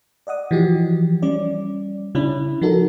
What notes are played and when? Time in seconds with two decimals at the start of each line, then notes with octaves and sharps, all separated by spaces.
0.27 D5 D#5 F#5 D#6
0.51 E3 F3 F#4 G4
1.22 G3 C#4 D5
2.15 C#3 C#4 D4 E4 B5
2.61 F3 D#4 F#4 A4 A#4